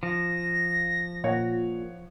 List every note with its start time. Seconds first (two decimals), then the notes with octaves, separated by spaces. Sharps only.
0.03 F3 A#6
1.24 A#2 C#5 F#5